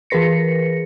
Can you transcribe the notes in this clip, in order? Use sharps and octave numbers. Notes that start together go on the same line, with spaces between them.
E3 G#4 A#4 B4 A#6 C#7